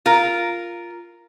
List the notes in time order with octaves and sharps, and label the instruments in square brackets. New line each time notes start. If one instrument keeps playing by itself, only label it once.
[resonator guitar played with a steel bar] F4 A#4